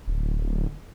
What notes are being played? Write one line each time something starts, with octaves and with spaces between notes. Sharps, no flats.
D1